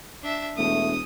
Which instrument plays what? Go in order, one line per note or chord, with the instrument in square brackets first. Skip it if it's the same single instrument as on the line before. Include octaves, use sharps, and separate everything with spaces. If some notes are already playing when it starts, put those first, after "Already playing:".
[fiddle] D4 E5
[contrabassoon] E1 [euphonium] A3 [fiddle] D#6